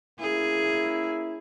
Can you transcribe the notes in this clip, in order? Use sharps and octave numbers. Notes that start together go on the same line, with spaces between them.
A#3 C#4 E4 G#4